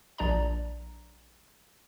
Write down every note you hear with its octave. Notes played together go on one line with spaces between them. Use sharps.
A#1 D4 D5 A#5